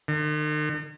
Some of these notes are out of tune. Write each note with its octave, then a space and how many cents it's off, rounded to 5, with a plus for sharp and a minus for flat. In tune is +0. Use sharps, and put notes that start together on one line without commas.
D#3 -45